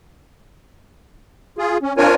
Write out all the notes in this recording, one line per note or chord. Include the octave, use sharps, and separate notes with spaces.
F4 G#4
C#4
C4 D4 F4 A#4 C#5 G#5